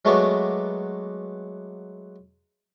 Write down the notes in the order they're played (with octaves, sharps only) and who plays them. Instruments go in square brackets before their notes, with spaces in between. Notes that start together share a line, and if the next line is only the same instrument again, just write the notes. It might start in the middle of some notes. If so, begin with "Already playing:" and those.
[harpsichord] F#3 G#3 A3 B3 F#4 D5